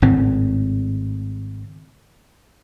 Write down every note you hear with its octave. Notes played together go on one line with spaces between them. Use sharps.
G#1 A2 C#3 C4